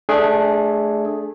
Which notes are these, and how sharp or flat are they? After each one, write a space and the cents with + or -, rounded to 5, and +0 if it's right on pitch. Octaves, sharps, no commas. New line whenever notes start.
A3 -20 D4 +0 G#4 +0